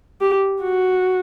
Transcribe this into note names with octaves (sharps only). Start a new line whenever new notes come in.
G4
F#4